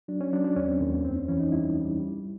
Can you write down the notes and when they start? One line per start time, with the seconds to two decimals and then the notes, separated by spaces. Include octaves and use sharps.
0.08 F#3 D4
0.21 C#4
0.33 F#3 D4
0.44 D4
0.56 D#2 C#4
0.68 C4
0.81 D#2 A#3
0.93 B3
1.05 F2 C4
1.16 C#4
1.28 E3 C#4
1.40 D#4
1.52 G3 E4
1.76 G3
2.00 G3